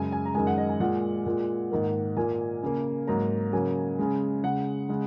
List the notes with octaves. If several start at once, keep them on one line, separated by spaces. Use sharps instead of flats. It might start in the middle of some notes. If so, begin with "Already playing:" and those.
Already playing: F#2 C#3 G#3 G#5
G#5
A#5
F#2 D#3 G#3 G#5
F#5
D#5
G#5
A#2 G#3 F#5
A#2 G#3
G#2 D#3 A#3
A#2 A#3 G#5
C#3 A#3
G#2 F#3 A#3 A#5
C#3 F#3 A#3 G#5
C#3 G#3
C#3 G#3 F#5
C#3 G#3